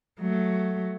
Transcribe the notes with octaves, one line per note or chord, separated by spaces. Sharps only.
F#3 A3